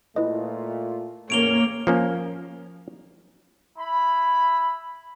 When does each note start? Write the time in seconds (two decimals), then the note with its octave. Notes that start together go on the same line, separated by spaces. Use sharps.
0.16 A#2 A3 E4 F4 B4 D#5
1.30 E2 A2 A#3 C#4 C#5 D7 F7 G7
1.87 F3 A#3 C#4
3.78 E4 B5